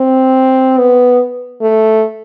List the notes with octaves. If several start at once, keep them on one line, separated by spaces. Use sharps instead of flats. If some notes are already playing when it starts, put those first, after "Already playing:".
Already playing: C4
B3
A3